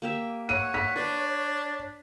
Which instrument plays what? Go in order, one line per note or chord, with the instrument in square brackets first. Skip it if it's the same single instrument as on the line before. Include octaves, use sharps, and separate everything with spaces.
[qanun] A#3 G4 E5
[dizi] C#5 [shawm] F#5 [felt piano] D#7
[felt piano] B6
[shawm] D4 [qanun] B4